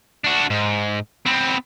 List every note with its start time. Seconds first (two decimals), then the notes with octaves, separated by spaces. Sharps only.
0.24 D4 F#4
0.50 G#2
1.26 B3 C4